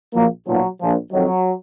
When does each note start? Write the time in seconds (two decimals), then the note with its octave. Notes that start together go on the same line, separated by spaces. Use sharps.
0.13 A#1 A#2 F3 F#3 A#3
0.47 B1 A#2 F3 F#3
0.80 A#1 A#2 F3
1.12 F2 D#3 F#3